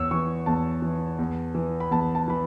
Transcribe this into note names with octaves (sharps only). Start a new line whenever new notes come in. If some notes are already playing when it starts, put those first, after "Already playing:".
Already playing: E2 C#5 E6
E3 C#6
E2 A5
E3
E2
E3
B5
E2 A5
A5
E3 B5